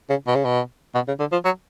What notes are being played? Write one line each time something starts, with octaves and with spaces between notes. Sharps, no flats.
C#3
B2
C#3
B2
B2
C#3
D3
F3
F#3